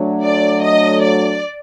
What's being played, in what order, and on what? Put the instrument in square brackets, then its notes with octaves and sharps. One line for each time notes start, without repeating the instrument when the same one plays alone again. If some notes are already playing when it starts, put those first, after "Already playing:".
Already playing: [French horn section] F#3 A3 D4
[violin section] D5
D#5
D5